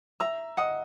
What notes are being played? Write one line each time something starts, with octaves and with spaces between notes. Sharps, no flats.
E5 A#5 E6
D#5 F#5 D#6